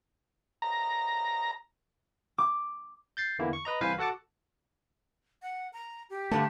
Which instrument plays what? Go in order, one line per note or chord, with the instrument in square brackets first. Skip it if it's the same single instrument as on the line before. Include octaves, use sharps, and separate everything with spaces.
[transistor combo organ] A#5
[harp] D6
[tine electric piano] G6 A6 C7
E2 D3 E3 A#3 E4
C#6
B4 D#5 A#5
C2 E3 B4 C5 F5 G#5
F#4 A4 F#5 A5 D6
[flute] F#5
A#5
G4
[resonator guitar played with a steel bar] G2 D3 A5 [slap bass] A3